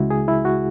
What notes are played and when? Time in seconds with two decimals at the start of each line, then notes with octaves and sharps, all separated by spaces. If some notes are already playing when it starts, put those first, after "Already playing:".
Already playing: C#2 C#3 G#3 E4 F#4
0.10 G#4
0.28 E4
0.45 F#4